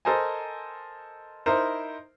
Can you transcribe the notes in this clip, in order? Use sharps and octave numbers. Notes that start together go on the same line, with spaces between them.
A4 A#4 C5 D#5 G#5
D#4 E4 A#4 C5